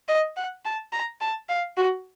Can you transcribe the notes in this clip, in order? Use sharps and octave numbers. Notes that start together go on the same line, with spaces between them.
D#5
F#5
A5
A#5
A5
F5
F#4